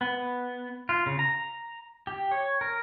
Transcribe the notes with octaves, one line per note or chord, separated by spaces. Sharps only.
B3
F4
C#3
A#5
G4
C#5
A#4